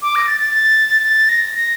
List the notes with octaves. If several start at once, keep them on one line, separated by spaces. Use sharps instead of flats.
D6
A#6
A6
A6
A6
A6
A#6
A#6